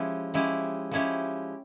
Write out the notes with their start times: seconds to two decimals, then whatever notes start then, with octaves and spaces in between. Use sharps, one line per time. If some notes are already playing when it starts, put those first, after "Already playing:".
Already playing: F3 G#3 C#4 E4 G4
0.34 F3 G#3 C#4 E4 G4
0.91 F3 G#3 C#4 E4 G4